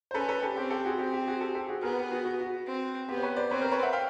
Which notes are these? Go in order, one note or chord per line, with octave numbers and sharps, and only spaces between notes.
C5
C#4 A4 B4
A4 B4
G4 A4
C4 G4
G4 A4
F#4 G#4
C4 G4
G4
F#4 G#4
G4 A4
G4 A4
F#4 G#4
B3 G#4 A#4
G4
F#4 G#4
F#4
F#4
C4
B3 G4
C5
B4 C#5
C5 D5
C4 B4 C#5
A#4 C5
B4 C#5
E5 F#5
F5 G5